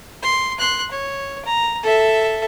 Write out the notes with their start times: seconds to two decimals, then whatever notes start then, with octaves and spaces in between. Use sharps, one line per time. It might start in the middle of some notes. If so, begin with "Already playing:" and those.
0.23 C6
0.59 C6 F#6
0.91 C#5
1.45 A#5
1.83 A4 E5